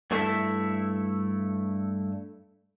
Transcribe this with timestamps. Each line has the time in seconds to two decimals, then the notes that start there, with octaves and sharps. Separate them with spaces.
0.11 G2 A3 E4 G#4 A4 E5